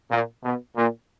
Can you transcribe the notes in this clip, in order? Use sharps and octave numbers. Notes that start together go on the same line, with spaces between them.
A#2
B2
A#2